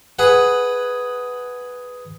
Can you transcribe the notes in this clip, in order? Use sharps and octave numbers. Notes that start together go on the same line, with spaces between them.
G#4 B4 F#5